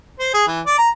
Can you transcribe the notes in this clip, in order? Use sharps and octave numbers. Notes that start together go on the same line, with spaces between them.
C5
G#4
E3
D5
A#5